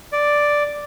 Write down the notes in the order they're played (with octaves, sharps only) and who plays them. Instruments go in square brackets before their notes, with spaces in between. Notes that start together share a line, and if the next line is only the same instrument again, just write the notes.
[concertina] D5